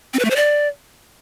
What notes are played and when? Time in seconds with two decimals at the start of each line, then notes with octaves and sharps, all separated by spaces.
0.14 C4
0.19 B4
0.25 A3
0.30 C5
0.36 D5